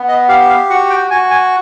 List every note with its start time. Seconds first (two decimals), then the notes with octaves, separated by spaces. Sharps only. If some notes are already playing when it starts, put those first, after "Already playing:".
Already playing: B3
0.08 D#5
0.29 G4 F5
0.49 F5
0.70 F#4 F#5
0.90 G5
1.11 F#4 G#5
1.31 G#5